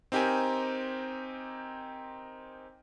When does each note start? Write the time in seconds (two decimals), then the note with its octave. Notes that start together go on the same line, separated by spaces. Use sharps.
0.12 C4 D#4 G4 A#4 G#5